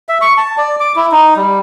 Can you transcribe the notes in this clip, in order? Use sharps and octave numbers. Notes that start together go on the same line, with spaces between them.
E5
C#6
A5
D5
D6
E4
D#4
G3